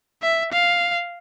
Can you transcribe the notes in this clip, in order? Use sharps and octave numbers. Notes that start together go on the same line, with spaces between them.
E5
F5